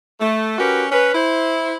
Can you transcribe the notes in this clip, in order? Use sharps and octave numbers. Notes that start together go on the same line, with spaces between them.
A3
C#4 F#4 G4 A#4 B4
C#4 B4
E4 C5